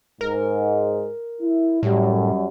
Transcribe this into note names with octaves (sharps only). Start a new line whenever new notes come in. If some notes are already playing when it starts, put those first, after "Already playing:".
G#2 A#4
E4
F#2 A2 G3